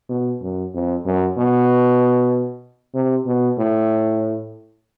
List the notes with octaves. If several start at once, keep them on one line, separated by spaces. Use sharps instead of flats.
B2
F#2
F2
F#2
B2
C3
B2
A2